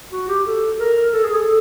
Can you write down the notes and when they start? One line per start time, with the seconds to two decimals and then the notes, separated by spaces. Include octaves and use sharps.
0.12 F#4
0.28 G4
0.46 A4
0.80 A#4
1.13 A4
1.24 G#4
1.35 A4